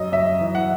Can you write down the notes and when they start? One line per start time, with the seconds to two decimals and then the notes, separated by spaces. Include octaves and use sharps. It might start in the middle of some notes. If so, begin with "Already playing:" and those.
Already playing: F#2 D#5
0.12 F#2 E5
0.41 E3
0.55 F#5